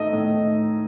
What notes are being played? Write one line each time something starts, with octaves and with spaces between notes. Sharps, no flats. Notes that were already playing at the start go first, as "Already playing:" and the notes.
Already playing: A2 A3 D#4 D#5
A2